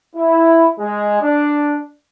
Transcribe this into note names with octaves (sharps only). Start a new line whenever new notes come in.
E4
G#3
D4